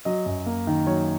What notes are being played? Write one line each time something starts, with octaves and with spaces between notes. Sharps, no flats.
F#3 D#5
F#2
A#3
D#3
F#3 C#5